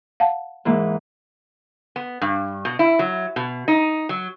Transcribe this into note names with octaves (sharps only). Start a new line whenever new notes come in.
F5 F#5 A5
G#2 E3 A#3
B3
G2
B2
E4
F#3
B2
D#4
F#3